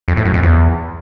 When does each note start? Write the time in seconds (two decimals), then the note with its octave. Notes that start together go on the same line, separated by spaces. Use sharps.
0.08 F2
0.16 A2
0.25 F#2
0.34 F2
0.43 E2